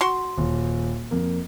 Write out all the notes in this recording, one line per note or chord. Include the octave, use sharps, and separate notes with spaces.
F#4 C6
D#1
F2 A#3